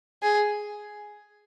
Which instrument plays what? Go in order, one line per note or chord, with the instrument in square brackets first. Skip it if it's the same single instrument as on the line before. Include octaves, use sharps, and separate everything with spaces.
[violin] G#4